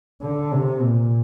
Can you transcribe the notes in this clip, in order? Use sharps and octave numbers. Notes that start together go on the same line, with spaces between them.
D3
C3
A#2